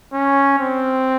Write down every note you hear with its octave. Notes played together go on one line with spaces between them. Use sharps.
C#4
C4